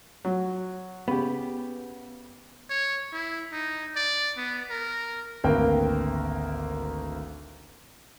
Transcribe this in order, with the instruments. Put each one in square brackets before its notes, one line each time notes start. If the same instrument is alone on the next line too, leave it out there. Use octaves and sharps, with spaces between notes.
[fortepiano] F#3
[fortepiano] C#3 G4 [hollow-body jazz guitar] B3
[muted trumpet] C#5
E4
D#4
D5
B3
A#4
[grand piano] G#1 D2 A#3 A#4 B4 G5